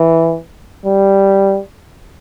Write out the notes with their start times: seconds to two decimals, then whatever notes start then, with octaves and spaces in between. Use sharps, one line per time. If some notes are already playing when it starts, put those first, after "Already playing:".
Already playing: E3
0.86 G3